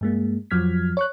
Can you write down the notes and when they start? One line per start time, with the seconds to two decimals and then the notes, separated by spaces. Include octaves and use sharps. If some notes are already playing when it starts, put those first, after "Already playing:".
0.01 G2 G#3 A#3
0.51 F2 F3 F#3 F6 G#6 B6
0.97 C#5 C#6 F#6